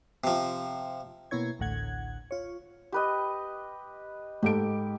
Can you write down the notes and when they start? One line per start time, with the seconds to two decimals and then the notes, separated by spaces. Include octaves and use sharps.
0.24 C3 F3
1.31 B2 A#3 B3 E4 C#5 G#6
1.59 A1 D2 A2 F#5 G#6
2.31 F4 C#5
2.92 G4 B4 D#5
4.43 G#2 G4 A4 D7